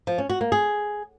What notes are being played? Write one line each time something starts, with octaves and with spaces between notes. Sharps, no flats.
F3
C#4
F#4
A#3
G#4